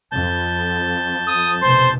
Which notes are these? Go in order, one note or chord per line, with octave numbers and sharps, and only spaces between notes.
F2 A5 G6
D#6
F1 B2 C5